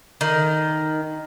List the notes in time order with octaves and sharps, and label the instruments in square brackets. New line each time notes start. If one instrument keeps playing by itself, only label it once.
[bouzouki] D#3